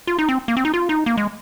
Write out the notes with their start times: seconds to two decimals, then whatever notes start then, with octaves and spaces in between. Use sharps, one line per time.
0.07 F4
0.19 D#4
0.29 C4
0.48 A#3
0.57 C4
0.65 D#4
0.74 F4
0.89 D#4
1.06 A#3
1.17 G#3